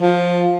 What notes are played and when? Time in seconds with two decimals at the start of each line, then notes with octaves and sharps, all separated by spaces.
0.01 F3